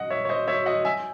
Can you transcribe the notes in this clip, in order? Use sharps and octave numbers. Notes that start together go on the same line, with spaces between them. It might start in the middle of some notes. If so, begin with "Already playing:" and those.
Already playing: D#5 F#5
C#5 E5
C#5
C5 D#5
C#5 E5
D#5 F#5
E5 G#5